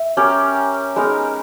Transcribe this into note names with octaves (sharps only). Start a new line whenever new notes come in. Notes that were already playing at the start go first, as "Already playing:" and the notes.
Already playing: E5
C#4 G4 A#4
G#3 B3 D#4 A#4